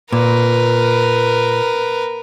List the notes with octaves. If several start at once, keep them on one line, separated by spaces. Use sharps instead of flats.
A#2 A#4 B4